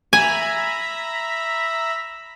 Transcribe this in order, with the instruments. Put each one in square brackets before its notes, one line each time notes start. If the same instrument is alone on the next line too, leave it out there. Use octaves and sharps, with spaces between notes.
[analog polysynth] E5 A#5 B5 [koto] G#5